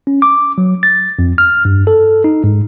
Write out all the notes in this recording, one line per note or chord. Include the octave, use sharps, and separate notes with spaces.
C#4
D6
F#3
A6
F2
F6
G2
A4
D#4
G#2